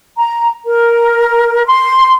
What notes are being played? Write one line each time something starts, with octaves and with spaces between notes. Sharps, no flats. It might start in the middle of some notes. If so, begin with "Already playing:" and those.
A#5
A#4
C6